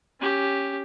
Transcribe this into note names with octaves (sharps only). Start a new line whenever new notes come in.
C#4 G4